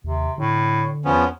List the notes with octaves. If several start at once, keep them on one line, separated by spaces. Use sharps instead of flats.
D#2 C3
A2 D3
E2 F3 B3 C#4